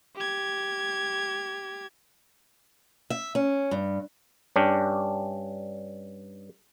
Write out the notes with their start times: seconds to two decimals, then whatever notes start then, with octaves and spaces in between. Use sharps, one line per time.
0.16 G4 G#6
3.10 E5
3.35 C#4
3.71 G2
4.56 G2 C#4 D4 G4